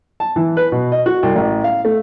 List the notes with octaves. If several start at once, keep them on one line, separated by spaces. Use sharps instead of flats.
A5
E3
B4
B2
D#5
F#4
C2
A1
F5
A3